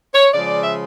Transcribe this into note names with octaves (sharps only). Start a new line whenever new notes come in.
C#5
C#3 F3 G#3 D5
E5